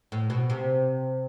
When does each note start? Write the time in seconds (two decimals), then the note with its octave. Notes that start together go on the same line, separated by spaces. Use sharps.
0.12 A2
0.30 B2
0.50 C3